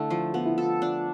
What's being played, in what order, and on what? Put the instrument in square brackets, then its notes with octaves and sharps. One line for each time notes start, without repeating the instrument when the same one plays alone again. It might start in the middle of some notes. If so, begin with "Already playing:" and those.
Already playing: [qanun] D3 A3 [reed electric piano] E4
[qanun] F3
[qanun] B3 [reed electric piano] F4
[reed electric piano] E4
[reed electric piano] F4 [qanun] A4
[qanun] D4